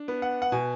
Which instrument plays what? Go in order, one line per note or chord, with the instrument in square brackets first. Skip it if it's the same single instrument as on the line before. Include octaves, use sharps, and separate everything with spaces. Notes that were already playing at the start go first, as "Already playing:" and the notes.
Already playing: [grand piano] D4
B3
F#5
F#5
B2 G#5